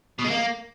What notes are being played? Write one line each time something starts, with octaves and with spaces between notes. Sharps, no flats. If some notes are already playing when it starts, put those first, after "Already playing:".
B2
G#3
A#3